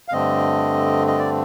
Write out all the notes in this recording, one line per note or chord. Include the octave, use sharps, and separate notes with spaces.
F5
G2 D3 A3 C4 D#5
D#5
D5